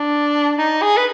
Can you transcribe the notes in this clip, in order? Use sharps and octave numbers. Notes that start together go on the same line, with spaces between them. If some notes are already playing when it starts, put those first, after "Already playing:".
Already playing: D4
D#4
G#4
B4